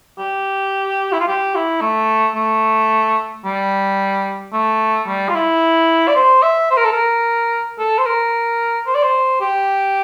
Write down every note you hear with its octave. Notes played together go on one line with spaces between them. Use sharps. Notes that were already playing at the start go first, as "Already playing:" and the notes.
G4
E4
F4
G4
E4
A3
A3
G3
A3
G3
F4
E4
D5
C5
E5
C5
A#4
A4
A#4
A4
C5
A#4
C5
D5
C5
G4